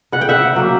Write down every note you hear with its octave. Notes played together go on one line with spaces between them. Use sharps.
C#3 F#5
G5
E5 F#5
F#3 A#3